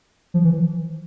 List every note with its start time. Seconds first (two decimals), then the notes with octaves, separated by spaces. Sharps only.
0.34 F3
0.45 E3